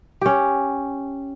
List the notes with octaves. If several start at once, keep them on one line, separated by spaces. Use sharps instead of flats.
C#4 G4